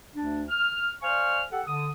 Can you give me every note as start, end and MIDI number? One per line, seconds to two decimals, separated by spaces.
0.15 0.43 38
0.15 0.43 62
0.49 0.90 89
1.02 1.41 72
1.02 1.41 74
1.02 1.41 77
1.02 1.41 80
1.02 1.41 85
1.02 1.41 89
1.51 1.61 67
1.51 1.61 69
1.51 1.61 78
1.67 1.89 50
1.67 1.89 87